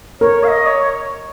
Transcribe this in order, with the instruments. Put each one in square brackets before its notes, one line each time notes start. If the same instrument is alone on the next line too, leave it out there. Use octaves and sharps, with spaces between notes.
[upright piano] A#4 [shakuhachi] C#5
[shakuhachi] F5
D#5
C#5